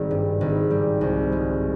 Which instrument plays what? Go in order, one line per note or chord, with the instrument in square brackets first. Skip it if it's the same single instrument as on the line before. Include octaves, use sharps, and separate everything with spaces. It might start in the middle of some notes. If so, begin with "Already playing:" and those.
Already playing: [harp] G#1 G3
G2
G#1
G3
C2
G#3